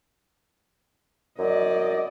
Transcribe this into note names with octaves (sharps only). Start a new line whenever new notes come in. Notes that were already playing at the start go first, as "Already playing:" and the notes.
F#2 D5 D#5